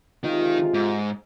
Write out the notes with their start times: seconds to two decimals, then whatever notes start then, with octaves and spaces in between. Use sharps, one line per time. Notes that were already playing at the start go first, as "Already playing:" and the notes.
0.24 C3 D#3 G#3 D#4 F4
0.74 G#2